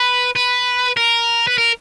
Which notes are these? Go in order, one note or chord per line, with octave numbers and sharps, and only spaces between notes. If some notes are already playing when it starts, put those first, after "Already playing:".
Already playing: B4
B4
A#4
B4
A#4